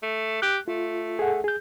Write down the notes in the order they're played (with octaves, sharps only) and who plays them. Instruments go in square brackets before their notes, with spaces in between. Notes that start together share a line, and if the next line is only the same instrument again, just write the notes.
[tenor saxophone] A3
[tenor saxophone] G4 [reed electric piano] F#6
[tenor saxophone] A3 [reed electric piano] F4
[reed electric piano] G#4 A4 F#5
G#4 G6